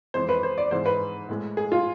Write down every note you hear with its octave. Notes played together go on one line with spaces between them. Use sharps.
F2 E3 G#3 C5
B4
C5
D5
G#2 E3 G#3 C5
B4
A2 G#3
G#4
F4